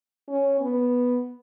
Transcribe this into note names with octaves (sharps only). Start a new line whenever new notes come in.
C#4
B3